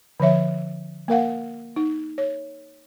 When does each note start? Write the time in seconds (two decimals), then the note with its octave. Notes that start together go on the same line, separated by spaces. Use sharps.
0.20 D3 F3 C#5 E5
1.08 A#3 A#4 F5 F#5
1.76 D#4
2.18 C#5